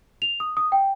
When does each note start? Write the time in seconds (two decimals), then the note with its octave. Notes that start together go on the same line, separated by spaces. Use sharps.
0.22 F7
0.40 D#6
0.57 D#6
0.72 G5